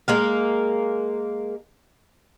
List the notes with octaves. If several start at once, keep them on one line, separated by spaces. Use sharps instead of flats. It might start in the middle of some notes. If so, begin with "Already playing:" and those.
G#3 A#3 F5